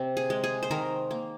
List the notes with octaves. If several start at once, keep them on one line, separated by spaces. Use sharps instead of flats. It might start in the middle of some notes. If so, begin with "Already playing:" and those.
Already playing: C3 C4
G#4
G#3
G#4
C5
D#3 A#4
A#3